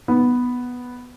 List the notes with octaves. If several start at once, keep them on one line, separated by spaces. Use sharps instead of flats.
B3